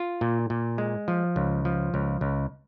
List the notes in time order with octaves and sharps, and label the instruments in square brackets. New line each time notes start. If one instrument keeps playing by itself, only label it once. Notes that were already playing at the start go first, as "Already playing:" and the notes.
Already playing: [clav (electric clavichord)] F4
A#2
A#2
G#3
F3
C#2
F3
C#2
C#2